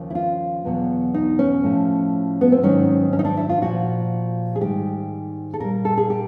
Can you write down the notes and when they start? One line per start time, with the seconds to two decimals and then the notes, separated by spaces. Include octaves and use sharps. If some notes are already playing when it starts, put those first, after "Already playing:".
Already playing: D#2 C#3 F3
0.10 E4
0.15 F4
0.65 E2 B2 F#3
1.14 D#4
1.39 C#4
1.64 A2 F3
2.41 B3
2.52 C4
2.63 G#2 D#3 F#3 C#4
3.13 C#4
3.19 D#4
3.25 D4
3.37 E4
3.49 F4
3.62 A#2 F3 F#4
4.55 G#4
4.61 G#2 D#3 G3 G4
5.54 A4
5.60 A#2 G3 A#4
5.85 A4
5.97 G#4
6.10 G4